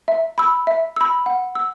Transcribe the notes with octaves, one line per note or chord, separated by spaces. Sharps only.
E5
B5 E6
E5
B5 E6
F#5
E6